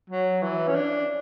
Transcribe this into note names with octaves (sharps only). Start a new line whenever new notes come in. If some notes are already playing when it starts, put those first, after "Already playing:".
F#3
E3
C#4
D4